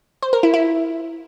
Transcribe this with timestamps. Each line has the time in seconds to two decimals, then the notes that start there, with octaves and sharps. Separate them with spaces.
0.22 C5
0.33 A#4
0.43 E4
0.54 E4